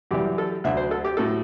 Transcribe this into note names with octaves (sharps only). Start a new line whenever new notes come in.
F#2 E3 G3 G4
A4
D2 D3 F#3 E5
C5
A4
G4
A2 F#3 A4